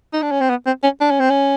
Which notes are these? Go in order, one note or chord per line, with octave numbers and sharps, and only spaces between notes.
D#4
D4
C#4
C4
B3
C4
C#4
D4
C#4
C4
C#4